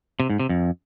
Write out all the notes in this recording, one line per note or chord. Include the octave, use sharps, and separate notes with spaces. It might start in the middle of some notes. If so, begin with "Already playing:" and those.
C3
G#2
C3
F2